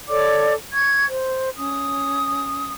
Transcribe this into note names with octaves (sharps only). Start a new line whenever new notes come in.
A4 C#5 D5 D6
C#6 G#6
C5
C#4 D#6